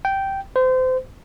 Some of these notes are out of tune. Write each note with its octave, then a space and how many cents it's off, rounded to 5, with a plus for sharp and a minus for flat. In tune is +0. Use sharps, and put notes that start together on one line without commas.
G5 -10
C5 -30